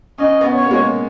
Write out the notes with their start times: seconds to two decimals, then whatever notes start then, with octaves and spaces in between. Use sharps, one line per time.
0.18 C#4 D#5
0.41 B3
0.53 C#5
0.64 A#3
0.71 G#3
0.79 A#3